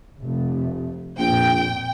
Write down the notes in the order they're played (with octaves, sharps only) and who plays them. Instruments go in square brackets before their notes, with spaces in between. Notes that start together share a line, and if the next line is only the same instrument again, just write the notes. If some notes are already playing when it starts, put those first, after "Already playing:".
[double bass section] F1 F2 A3
[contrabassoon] A#1 [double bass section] F2 A#2 [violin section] G5